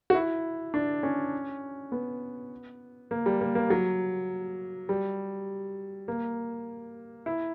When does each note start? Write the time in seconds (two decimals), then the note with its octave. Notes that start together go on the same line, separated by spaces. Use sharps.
0.10 F#4
0.15 E4
0.74 D4
1.03 C#4
1.92 B3
3.11 A#3
3.26 G3
3.41 A#3
3.55 A#3
3.70 F#3
4.89 G3
6.08 A#3
7.26 E4